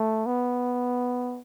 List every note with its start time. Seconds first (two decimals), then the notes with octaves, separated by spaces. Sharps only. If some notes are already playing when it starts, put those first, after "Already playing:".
Already playing: A3
0.27 B3